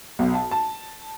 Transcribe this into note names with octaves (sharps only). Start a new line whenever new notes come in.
B1
A5
A5